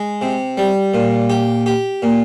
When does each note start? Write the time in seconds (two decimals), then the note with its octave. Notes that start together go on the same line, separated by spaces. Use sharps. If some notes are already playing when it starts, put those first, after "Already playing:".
Already playing: G#3
0.21 C3
0.57 G3
0.94 A#2
1.30 G4
1.66 G4
2.02 A#2